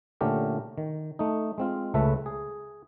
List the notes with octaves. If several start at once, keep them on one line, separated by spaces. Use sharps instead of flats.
A#2 D3 A3 C#4 G4 A#4
D#3
A3 D#4
G#3 C4 F4
C#2 C#3 A3 A4 B4 E5
G#4